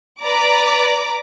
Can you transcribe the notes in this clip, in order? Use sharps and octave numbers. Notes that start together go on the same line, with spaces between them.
B4 D5 A#5 D6